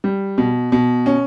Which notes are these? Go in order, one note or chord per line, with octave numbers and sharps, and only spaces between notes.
G3
B2
B2
C#4